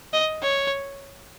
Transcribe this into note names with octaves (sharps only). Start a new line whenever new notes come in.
D#5
C#5